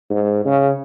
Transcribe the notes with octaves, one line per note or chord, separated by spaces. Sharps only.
G#2
C#3